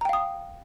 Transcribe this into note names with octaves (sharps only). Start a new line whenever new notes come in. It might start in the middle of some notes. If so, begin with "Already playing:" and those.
F5 G5 A#5 D#6